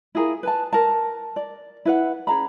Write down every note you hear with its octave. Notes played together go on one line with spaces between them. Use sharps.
E4 F4 G#4 A#4
B4 G#5 A5
A#4 A5
D5
E4 B4 F#5
C#4 G#4 A#5 B5